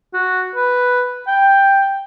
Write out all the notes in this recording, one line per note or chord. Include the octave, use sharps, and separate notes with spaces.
F#4
B4
G5